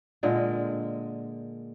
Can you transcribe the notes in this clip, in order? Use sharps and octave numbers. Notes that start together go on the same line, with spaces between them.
A#2 D3 G#3 A#4